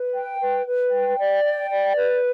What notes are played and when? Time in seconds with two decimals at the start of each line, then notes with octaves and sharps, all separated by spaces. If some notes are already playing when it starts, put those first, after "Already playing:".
Already playing: B4
0.14 G5
0.41 B4
0.66 B4
0.92 G5
1.18 D5
1.45 G5
1.71 D5
1.96 B4